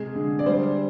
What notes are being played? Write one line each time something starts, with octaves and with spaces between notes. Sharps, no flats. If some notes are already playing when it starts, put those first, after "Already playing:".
Already playing: C3 G#3 G#4
D3
D5
G3 C5